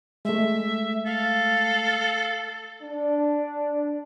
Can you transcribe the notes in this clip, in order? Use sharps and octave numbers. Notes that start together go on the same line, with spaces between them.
G#3 A3 E5
A4 F5
D4